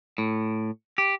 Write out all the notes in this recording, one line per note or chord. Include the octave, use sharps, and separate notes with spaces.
A2
G4